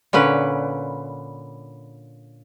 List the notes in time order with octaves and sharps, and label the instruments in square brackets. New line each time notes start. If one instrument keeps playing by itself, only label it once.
[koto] A#2 D3 C#4 B4